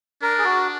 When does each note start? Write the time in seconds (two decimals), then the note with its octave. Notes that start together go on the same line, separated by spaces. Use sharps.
0.22 D4 A#4
0.38 G#4
0.44 F#4